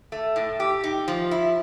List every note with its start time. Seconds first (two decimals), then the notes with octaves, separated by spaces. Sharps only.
0.12 A3
0.36 A2
0.60 G4
0.84 D#4
1.08 F3
1.31 E4